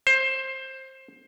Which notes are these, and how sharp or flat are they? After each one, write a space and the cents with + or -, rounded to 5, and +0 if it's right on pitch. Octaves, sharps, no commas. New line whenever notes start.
C5 +15